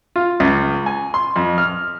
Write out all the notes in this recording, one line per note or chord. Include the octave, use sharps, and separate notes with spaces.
F4
C#2
G#5
C6
F2
F6